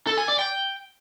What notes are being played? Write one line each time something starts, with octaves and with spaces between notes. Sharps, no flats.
A4
G#5
D5
G5